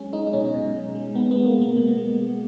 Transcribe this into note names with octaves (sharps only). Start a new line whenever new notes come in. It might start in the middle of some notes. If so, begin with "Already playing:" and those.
Already playing: F#3 G#3 C#4
G#3 D#4
D#4
B2 C#4
B2
G#3
G#3
G#3 B3
G#3 B3
A#3
B2 A#3
B2 A#3
G#3
G#3